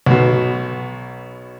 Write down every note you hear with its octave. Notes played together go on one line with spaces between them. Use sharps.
B1 B2